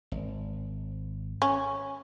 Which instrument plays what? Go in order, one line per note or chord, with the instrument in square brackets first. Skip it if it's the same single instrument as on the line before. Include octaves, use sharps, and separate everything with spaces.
[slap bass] G#1
[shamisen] C#4